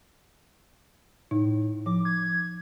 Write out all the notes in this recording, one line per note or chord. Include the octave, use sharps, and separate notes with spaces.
A2 D#4
F3 D6
G#6